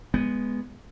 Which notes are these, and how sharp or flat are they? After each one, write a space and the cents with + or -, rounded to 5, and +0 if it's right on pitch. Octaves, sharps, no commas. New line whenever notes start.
G#3 +0 B3 +0